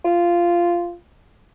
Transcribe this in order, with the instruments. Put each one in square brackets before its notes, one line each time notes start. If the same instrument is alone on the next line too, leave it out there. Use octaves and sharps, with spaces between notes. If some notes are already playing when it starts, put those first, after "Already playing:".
[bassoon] F4